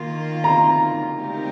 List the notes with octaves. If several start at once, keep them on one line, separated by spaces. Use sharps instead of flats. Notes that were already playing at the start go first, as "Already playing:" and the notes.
Already playing: D#3 A#3 F4
A#5
G#3 C4 D#4 G4 A#4